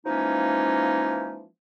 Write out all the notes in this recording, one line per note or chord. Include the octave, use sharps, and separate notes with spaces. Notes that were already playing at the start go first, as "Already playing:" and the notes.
E3 F3 G#3 A#3 C#4 D#4